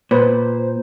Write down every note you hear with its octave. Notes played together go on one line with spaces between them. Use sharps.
A#2 B4 C5